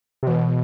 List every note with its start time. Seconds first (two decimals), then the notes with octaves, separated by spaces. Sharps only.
0.23 C3
0.27 B2 E3